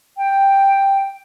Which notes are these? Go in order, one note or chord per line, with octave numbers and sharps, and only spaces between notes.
G5